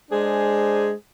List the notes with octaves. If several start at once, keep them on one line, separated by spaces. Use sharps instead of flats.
G#3 D4 G#4 C5